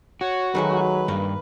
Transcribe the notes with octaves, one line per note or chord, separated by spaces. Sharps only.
F#4 C#5
D#3 F#3 G#3 A3 B4
G2 A#3